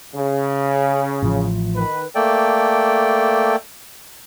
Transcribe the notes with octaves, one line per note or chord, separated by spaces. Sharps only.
C#3
A1 F3
D#3 B4
A3 A#3 A4 D5 G5